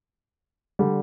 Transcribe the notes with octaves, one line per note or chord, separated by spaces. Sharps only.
D3 G3